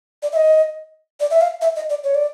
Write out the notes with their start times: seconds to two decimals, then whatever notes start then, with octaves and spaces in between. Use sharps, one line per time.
0.23 D5
0.32 E5
0.36 D#5
1.20 D5
1.31 E5
1.41 F5
1.62 E5
1.76 D#5
1.90 D5
2.04 C#5
2.15 D5